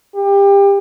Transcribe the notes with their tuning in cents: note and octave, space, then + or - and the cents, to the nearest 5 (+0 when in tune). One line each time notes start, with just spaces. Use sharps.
G4 +25